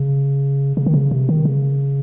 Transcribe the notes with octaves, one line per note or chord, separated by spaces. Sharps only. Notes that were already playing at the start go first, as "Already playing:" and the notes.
Already playing: C#3
C#3
D#3
C#3
C3
D#3
C#3